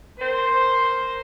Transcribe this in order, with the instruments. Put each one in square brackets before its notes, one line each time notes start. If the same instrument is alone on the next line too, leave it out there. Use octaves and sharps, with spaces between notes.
[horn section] A#4 C5